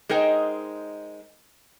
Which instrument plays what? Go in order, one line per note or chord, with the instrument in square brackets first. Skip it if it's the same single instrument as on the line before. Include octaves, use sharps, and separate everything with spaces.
[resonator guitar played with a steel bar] G#3 D#4 A#4 C5 G5